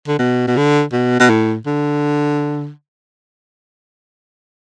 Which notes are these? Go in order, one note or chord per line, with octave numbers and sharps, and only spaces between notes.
D3
B2
B2
D3
B2
B2
A2
D3